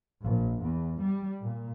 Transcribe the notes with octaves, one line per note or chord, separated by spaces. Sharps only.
A#1
E2
G3
A#2